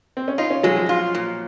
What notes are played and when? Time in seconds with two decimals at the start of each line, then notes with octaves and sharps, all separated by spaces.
0.17 C4
0.28 C#4
0.38 D#4 F4
0.50 C#4
0.63 F#3 G#3
0.76 F3
0.89 F4
1.15 A#2